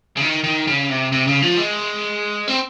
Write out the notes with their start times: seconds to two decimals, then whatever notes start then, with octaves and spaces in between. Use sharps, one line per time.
0.17 C#3
0.21 D#3
0.44 D#3
0.67 C#3
0.90 C3
1.12 C3
1.27 C#3
1.42 F3
1.57 G#3
2.48 C4